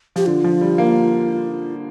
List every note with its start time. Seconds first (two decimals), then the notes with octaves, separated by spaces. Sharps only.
0.16 F3 G4
0.26 D3 F4
0.44 F3
0.61 G3
0.78 A#3